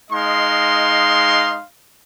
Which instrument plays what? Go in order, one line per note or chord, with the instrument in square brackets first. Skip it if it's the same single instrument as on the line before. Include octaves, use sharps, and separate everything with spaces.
[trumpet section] G#3 D#4 D#5 F5 C6